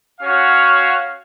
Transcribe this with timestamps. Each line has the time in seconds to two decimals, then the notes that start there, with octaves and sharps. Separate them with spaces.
0.19 C#4 F#4 C#5 F5